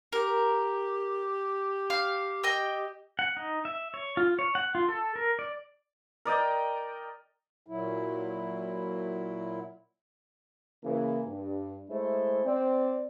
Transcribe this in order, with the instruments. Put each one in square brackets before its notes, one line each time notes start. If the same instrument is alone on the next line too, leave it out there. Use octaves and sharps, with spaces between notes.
[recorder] G4 [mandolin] A#4
[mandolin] F5
D#5 G5 E6
[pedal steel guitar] F#5
D#4
E5
C#5
F4
C#5
F#5
F4
A4
A#4
D5
[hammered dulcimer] A#4 D5 D#5 G5
[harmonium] A#2 F#3 E4
[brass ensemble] C#3 E3 A#3
G2
G#3 A3 E4 C5
C4 D5